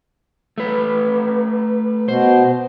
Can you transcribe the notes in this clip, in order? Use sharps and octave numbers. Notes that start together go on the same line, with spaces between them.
A3 B4
B2 C5